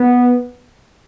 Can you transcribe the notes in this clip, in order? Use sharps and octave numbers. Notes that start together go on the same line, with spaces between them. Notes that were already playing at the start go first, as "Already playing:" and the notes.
Already playing: B3